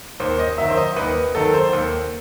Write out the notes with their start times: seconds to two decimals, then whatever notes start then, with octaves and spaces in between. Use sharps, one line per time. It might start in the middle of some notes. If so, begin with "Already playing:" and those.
0.20 D#2 C5
0.39 D#5
0.58 D#3 F#3 E5
0.70 C5
0.77 D#5
0.96 D#2 B4
1.35 D#3 F#3 A4
1.54 C5
1.73 D#2